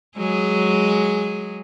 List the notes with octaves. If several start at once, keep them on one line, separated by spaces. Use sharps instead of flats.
F#3 G#3 G#4